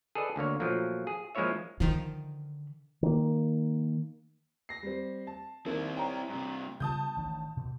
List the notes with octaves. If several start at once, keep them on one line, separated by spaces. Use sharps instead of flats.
G#4 A4 B4 D5 D#5
D2 D3 A#3 C#5
A#2 F3 F#3 A3 A#3
G#4
F3 G#3 A#3 E4 C#5 E5
D3 D#3 F3
D#3 A#3
A#6 C7
G3 C4
A5
D#3 A#3 C4 E4
C#5 G5 A#5
G2 C3
C#3 G3 B3 A5 D#6 G6
A1 D#3 D4
B2